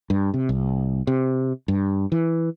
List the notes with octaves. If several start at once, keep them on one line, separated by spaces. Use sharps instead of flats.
G2
C3
C2
C3
G2
E3